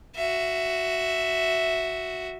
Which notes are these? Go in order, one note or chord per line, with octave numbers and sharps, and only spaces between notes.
F#4 E5